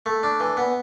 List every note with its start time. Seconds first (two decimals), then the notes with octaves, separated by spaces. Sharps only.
0.06 A3
0.23 D4
0.40 E3
0.57 B3